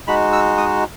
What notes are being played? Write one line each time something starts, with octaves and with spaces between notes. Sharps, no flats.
G#3 D#4 F#4 B5
E6
D#6